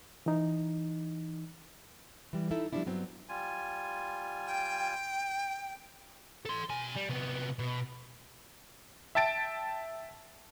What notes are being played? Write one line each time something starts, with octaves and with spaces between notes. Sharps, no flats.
E3 D#4
E3 G3
D#4 E4 A4 E5
F3 G3 A#3 B3 D4 E4
G2 F#3 B3 C4
G3 F4 G#5
G5
A4 C6
B2 G#5
G3
C3 B3
B2
E5 G5 A5 A6 D7